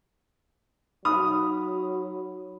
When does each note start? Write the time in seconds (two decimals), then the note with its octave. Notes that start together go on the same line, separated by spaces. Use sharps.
1.05 F#3 D#4 B5 D#6